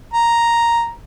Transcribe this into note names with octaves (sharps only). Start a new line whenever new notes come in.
A#5